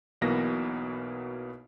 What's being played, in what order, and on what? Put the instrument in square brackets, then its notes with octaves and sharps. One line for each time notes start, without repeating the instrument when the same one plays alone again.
[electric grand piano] B1 B2 E3 A#3 B3 A#6